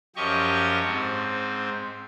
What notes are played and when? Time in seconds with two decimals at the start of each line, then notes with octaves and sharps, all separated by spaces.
0.16 F#2 F3 G4 D#5 C#6
0.84 G#2 C4